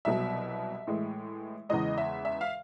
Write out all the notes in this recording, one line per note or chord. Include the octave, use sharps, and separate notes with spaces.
C2 B2 F#3 E5
A2 E3 G#3
E2 C#3 E3 G#3 D#5
E5
E5
F5